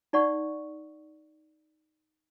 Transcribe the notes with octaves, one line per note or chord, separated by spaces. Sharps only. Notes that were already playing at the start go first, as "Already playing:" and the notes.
D#4 D5 F#5 C#6